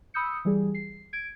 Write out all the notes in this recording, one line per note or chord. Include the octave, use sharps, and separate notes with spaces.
B5 D#6 E6 G6 C#7
E3 G3 G#4
C7
G#6 D7